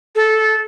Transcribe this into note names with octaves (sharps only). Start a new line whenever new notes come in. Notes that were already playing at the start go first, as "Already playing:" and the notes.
A4